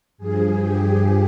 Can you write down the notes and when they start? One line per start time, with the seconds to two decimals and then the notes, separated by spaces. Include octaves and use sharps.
0.18 G2 F3 G#4
0.59 G4